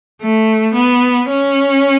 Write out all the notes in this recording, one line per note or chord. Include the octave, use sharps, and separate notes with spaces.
A3
B3
C#4